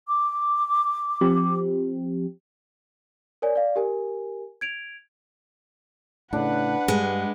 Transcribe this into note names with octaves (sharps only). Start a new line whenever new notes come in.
D6
F3 C4 G4
A#4 C#5 D5 G#5
D5 F5
G4 A#4 G#5
G#6 D7 F7
A2 C#3 D4 B4 F#5
G2 G#3